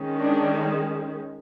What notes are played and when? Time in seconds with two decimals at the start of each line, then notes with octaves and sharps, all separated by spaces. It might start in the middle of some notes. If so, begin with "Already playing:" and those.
Already playing: D#3 G#3 C#4
0.20 D4